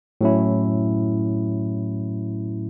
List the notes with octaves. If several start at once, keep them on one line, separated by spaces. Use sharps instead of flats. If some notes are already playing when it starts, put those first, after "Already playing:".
A2 F#3 C#4 E4